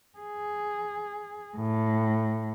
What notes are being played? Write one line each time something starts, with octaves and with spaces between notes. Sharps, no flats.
G#4
A2